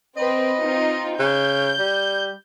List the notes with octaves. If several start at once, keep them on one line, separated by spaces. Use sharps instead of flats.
C4 B4 D#5
C4 D#4 F4
C#3 G6
G3